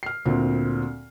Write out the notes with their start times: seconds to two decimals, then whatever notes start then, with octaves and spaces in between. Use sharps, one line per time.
0.03 F6 C7
0.26 D2 A#2 C4